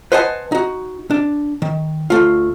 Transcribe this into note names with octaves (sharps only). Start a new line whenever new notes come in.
B4 C5 D#5 F#5 G#5 A5
D#4 F#4
D4
D#3
D2 A3 F4